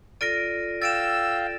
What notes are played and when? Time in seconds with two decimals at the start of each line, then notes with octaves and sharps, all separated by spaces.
0.21 F4 A4 D5 A#6 D7 D#7
0.82 F5 G5 E6 A6 D7 E7